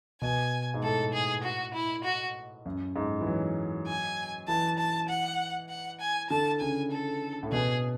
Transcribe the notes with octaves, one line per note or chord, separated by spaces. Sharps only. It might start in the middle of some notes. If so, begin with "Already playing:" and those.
B2 G#5
G#2
A2 A4
G#4
F#4
E4
F#4
F#2
G#2
E3
F#3
G#5
E3 A5
A5
F#5
F#5
G#5
D3 A5
C#3 G#5
A4
A2
B2 G#4